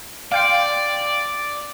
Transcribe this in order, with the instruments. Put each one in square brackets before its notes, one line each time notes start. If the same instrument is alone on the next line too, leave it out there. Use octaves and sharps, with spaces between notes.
[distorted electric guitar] D5 [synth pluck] F5 G5 C6